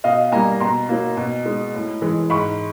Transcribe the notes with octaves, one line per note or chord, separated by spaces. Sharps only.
B2 D#5 F5
G3 A#3 G#5 A#5
B2 A#5 C6
F#3 A#3
B2
G#3
A2
E3 G#3
G#2 B5 C#6